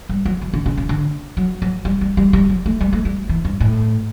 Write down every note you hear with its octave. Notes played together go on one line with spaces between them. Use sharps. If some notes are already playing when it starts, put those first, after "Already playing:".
G3
F#3
E3
D3
C#3
C#3
D3
F#3
F#3
G3
G3
G3
G3
F#3
A3
G3
A3
G3
E3
G2
A2